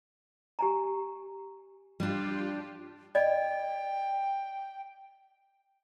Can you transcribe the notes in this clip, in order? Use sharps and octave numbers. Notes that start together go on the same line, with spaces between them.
G4 G#5 A#5
G3 D4 F4 G4
D5 D#5 G5